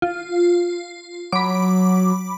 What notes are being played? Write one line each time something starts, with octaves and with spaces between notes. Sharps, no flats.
F4
F#3 B5 D6